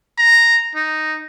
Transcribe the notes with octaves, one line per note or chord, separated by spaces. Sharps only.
A#5
D#4